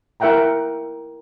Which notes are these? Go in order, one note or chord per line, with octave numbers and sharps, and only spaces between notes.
E4 A#4 E5 F#5 G5 A#5